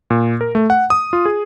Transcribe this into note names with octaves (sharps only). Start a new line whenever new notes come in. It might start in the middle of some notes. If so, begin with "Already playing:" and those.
A#2
A#4
A3
F#5
D#6
F4
G#4